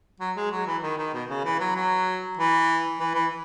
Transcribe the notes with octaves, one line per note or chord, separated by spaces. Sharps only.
F#3
G#3
F#3
E3
D#3
D#3
B2
C#3
E3
F#3
F#3
E3
E3
E3